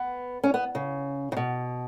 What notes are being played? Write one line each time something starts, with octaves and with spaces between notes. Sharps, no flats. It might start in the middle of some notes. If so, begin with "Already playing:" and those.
Already playing: B3
C#4
B3
C#3
C#3
B2